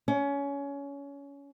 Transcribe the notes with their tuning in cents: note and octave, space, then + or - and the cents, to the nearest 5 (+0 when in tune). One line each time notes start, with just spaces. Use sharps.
C#4 +25